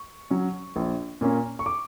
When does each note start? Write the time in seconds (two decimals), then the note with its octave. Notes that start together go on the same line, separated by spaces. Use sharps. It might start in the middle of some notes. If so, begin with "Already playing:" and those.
Already playing: C#6
0.30 F#3 C#4
0.76 A#1
1.21 A#2 A#3 C#4
1.59 C#6
1.66 D6